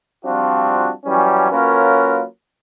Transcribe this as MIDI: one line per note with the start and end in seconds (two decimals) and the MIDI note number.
0.25 0.90 53
0.25 0.90 55
0.25 0.90 60
0.25 0.90 62
0.25 0.90 65
0.25 0.90 66
1.06 1.48 52
1.06 1.48 54
1.06 1.48 55
1.06 1.48 61
1.51 2.22 54
1.51 2.22 58
1.51 2.22 61
1.51 2.22 65
1.51 2.22 70
1.51 2.22 71